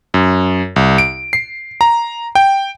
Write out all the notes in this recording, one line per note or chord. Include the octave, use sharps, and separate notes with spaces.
F#2
C2
D7
C7
A#5
G5